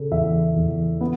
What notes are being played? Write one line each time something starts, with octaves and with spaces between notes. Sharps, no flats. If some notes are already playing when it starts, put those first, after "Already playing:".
Already playing: C#3 A4
E2 E5
E2
B3